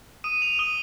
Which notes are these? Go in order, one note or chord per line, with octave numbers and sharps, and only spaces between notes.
D#6 D#7
F7
D#6 G7